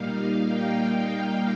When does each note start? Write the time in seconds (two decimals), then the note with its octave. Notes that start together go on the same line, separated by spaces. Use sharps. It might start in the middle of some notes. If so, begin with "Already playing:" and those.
Already playing: A#2 G3 A#3 D#4 F5
0.42 G5